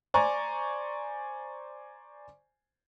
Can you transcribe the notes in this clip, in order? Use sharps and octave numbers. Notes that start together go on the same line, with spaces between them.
C5 D5 G#5 A#5 C#6